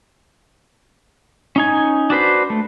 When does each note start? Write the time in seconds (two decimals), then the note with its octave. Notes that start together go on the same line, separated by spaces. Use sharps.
1.56 C#4 D#4 G#5
2.10 D4 F#4 B4 C5
2.50 A3